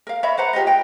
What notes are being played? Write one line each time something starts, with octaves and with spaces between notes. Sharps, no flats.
A#4 F5
C#5 D#5 E5 B5
B4 C5 F#5 A#5
F4 G4 B4 D#5
G5